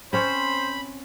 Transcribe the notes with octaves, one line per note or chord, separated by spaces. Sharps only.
C4 C#4 C5 C#5 B5